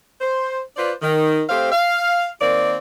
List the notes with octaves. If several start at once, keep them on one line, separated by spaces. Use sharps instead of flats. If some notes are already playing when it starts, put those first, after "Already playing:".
C5
F4 B4 C5 D5
D#3
A3 C4 G4 C5 F5
F5
D#3 A#3 C4 D5